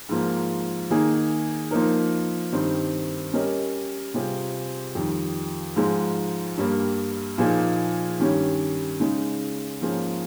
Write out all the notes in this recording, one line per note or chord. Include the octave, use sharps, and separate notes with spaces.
G#2 F3 A#3
D#3 A#3 D#4 G#4
F3 A#3 D#4 A#4
G2 D#3 G3 C4 D#4
G3 C#4 G4 A#4 D#5
C3 G3 C4 F4 G#4
F2 D#3 G3
G#2 F3 G#3
G2 G3 A#3
A#2 F3 A#3 D#4 G#4
G2 D#3 G3 C#4 G4
C#3 G#3 D#4
G#2 F3 A#3 C#4 G#4